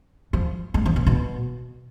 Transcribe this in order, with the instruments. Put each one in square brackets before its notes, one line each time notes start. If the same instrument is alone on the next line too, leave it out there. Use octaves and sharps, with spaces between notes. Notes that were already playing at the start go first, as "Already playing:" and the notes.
[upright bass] F3
G#3
F3
B2
B2